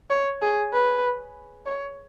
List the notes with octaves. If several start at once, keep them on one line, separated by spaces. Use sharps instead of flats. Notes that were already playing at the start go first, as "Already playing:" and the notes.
C#5
G#4
B4
C#5